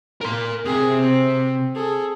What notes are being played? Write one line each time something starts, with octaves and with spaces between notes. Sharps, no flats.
A#4 C6
C3 G#4
C4
G#4 A4